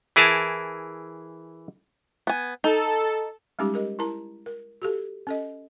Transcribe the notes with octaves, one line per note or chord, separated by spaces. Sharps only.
E3 E4 G#4 A#4 A5
B3 G#5
D#4 A4
G3 G#3 C#4 D#4 G4 D6
G4 A#4 D#5
E4 A#4 A5 A#5
A#4
F#4 G4 A4
C#4 A4 D#5